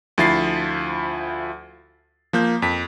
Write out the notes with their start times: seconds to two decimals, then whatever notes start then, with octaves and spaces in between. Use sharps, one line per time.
0.18 D2 F3 E4 A6 C7
2.33 F3 A#3 G6
2.62 F2 B6